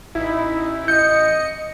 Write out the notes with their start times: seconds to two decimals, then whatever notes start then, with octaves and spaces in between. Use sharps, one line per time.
0.15 A1 D#4 E4
0.88 D#5 G6 C#7